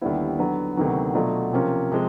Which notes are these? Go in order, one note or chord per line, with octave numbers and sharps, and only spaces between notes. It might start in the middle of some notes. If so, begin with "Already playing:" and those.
D#2 D3 G3 B3 E4
D3 F#3 B3
D2 C3 D#3 F#3 B3
B2 F#3 A3 D4 F4
C3 F3 A#3 C#4 F4
C3 F3 G#3